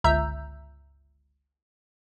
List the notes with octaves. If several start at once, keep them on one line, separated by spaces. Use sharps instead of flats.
G1 C#2 E5 A#5 E6 G6